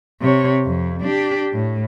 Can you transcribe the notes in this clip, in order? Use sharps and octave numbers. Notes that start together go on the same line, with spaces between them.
C3 C#5
F2
D4 G4
A2